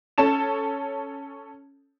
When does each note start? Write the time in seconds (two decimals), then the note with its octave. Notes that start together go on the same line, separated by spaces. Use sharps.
0.18 C#4 A4 C#5 A5 E7